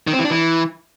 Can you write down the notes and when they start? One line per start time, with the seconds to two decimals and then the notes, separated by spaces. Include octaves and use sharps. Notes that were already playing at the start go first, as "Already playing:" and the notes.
0.07 D#3
0.13 C4
0.19 E3
0.25 D4
0.30 E3